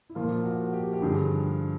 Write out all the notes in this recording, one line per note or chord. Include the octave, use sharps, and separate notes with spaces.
E4
A#2 F3 A#3 F4
F#4
G4
G4
G2 D3 F3 G#4